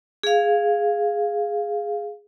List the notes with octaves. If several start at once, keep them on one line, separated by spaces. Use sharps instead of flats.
G#4 F5